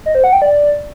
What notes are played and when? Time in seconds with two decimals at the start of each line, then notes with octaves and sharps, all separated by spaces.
0.06 D#5
0.15 C5
0.24 F#5
0.33 G5
0.42 D5